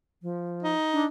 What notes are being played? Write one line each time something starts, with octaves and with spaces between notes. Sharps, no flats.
F3
D#4
D4